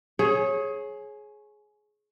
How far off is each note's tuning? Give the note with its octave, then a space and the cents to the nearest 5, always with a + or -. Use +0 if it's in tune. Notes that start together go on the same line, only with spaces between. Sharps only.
G#4 +20 C#5 -20